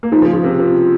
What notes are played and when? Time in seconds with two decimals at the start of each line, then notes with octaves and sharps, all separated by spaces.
0.03 A#3
0.12 F3 G#3 D#4
0.22 C#3 F3
0.33 C#3 F4
0.44 C3
0.59 C3